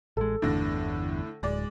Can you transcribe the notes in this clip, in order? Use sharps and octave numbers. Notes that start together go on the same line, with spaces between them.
A1 G#3 A4
G1 E2 A2 D3 D4 A#6
D1 G#3 D5